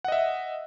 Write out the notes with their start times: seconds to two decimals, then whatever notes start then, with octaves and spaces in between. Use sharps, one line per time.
0.04 F#5
0.08 D#5
0.12 E5